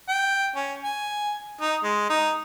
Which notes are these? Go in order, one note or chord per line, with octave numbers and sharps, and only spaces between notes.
G5
C#4
G#5
D#4
G#3
D#4